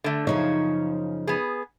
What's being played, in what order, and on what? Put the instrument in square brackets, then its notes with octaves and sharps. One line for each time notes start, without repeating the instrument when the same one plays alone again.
[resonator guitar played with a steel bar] D3 A3
[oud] F#2 C#3 F3 [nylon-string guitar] D#4 [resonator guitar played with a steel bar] C#5
[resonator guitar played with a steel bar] B3 G#4